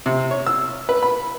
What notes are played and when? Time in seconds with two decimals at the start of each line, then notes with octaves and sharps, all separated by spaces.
0.06 C3
0.31 C#5
0.46 E6
0.89 B4
1.03 B5